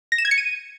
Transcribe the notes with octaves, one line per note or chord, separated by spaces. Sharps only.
A#6
E7
G#6
C#7
D#7